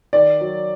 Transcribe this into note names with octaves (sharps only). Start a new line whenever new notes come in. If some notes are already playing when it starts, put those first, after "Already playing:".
D#3 D5
F#3